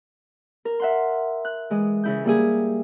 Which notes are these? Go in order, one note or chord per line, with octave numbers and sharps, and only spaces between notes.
A#4
E5 F#5 C6
F#6
E3 G#3 D#6
C#3 E4 G6
G3 A#3 E4 G#4